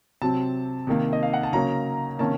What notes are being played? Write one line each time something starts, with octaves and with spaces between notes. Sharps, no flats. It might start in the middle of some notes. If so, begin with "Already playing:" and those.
C3 F#3 C4 A5
C3 D#3 A#3
D#5
F5
F#5
A5
C#3 F#3 A#3 C#4 A#5
C3 D#3 A#3 C#4 A5